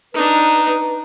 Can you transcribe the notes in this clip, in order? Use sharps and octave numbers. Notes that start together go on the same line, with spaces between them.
D4 D#4 B4